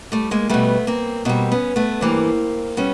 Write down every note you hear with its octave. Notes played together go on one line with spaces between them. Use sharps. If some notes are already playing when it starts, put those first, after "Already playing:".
G3 A3
G#3 A#3
B2 G3 A3 B3
A#3 C4
B2 G3 A#3 C4
B3 C#4
A3 B3
G2 E3 G3 A#3 C4
G3 B3 C#4